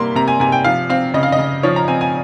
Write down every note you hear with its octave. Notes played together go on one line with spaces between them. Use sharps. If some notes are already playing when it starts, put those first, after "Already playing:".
Already playing: C3 G3 A#3 C6
C3 A#5
G#5
C3 G#5
G5
F3 F5
C4 F5
C#3 D#5
F5
D#5
C#3
F3 C#5
A#5
C4 G#5
G#5